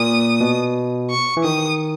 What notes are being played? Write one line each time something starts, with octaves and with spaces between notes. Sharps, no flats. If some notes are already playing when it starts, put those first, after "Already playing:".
Already playing: A#2 D#6
B2
C#6
E3
D#3 D#6